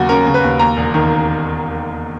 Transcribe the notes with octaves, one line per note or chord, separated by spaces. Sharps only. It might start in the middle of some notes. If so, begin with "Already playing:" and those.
Already playing: D#2 C#3 F#3 F#4
C#4 A#4
C#3
B4
D#2
D#2 A#5
E1
D#3